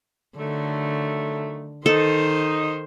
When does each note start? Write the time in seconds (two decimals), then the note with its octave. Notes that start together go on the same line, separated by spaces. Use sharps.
0.38 D3 D#3 F#3 A3
1.86 D#3 D#4 A4 C5